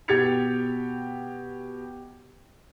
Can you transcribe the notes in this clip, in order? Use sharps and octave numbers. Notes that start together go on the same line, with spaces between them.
B2 G4 G#6 A6 C#7 F7